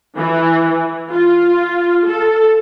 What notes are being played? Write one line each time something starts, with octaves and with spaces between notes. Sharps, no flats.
E3
F4
A4